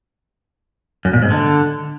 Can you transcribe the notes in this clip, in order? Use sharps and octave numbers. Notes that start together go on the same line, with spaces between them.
F#2
A#2
G#2
D3